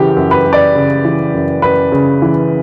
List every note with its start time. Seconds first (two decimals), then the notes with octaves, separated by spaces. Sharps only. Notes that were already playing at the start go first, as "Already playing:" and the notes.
Already playing: F#2 C#3 E3 G4
0.17 F#2
0.31 B4
0.46 F#2
0.53 D5
0.75 C#3
1.05 E3
1.34 F#2
1.62 F#2 B4
1.92 C#3
2.22 E3